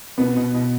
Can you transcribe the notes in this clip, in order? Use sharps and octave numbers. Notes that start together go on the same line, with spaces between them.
B2 B3
B2
B2